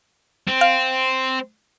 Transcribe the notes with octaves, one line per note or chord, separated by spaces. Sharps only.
C4
F5